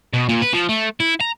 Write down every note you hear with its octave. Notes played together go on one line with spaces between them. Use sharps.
B2
A#2
B4
F3
A3
E4
A#5